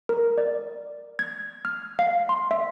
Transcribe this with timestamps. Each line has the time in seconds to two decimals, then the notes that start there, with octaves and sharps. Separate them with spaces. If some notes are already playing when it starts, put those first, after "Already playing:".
0.09 A#4
0.38 D5
1.19 G#6
1.65 F6
1.99 F5
2.29 C6
2.51 E5